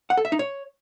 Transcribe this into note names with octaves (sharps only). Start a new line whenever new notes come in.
F#5
A4
E5
D#4
C#5